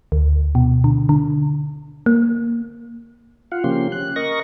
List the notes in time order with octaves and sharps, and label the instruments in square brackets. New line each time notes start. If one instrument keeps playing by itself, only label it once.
[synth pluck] D2
B2
D3
D3
A#3
[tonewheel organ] F4 F5 F#5
C#3 F3 A#3 C#4 G4 C6
F#6
A#4 D#5 C#6 A#6